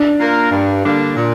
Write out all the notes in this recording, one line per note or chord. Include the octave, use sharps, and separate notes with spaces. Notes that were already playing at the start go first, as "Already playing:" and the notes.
Already playing: D4
A#3 F4 A#4
G2
D3 G3 A#3 D4
A#2